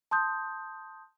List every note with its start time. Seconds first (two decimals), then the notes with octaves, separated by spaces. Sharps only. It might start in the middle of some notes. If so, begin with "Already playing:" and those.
0.11 A5 C6 D#6 G6